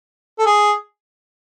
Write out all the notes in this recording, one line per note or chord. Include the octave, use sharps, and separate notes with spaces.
A4
G#4